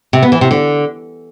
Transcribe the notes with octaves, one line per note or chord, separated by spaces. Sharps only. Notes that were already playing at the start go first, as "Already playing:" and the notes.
C3
B3
E3
C3
D3